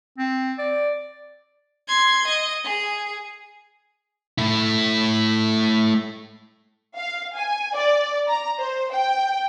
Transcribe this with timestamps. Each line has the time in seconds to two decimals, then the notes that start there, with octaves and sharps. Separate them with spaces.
0.18 C4
0.59 D5
1.87 C6 G#6
2.27 D#5
2.64 G#4
4.38 A3 E4
6.97 F5
7.36 G#5
7.74 D5
8.28 A#5
8.60 C5
8.93 G5